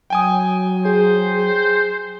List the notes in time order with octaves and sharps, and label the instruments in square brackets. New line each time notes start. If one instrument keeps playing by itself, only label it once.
[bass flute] F#3 [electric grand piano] G5 G#5 D#6
[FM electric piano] G#4 [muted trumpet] C5